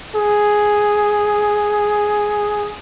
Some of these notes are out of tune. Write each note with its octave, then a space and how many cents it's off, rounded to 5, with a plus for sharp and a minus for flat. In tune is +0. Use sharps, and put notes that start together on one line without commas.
G#4 +5